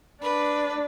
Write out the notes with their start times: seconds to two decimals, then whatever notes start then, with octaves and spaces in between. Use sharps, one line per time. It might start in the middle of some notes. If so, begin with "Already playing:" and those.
0.22 D4 B4